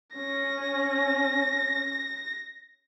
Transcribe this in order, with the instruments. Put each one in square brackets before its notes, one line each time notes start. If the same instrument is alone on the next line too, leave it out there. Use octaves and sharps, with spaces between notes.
[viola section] C#4 [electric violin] A#6